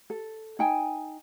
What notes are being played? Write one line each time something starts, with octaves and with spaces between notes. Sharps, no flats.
A4
D#4 G5 G#5